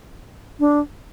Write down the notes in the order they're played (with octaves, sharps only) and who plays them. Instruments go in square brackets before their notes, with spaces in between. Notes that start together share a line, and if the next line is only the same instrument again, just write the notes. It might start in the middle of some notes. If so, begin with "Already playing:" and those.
[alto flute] D4